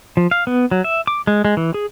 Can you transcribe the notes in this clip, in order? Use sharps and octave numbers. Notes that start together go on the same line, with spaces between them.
F3
F5
B3
F#3
E5
D6
G#3
G#3
E3
G#4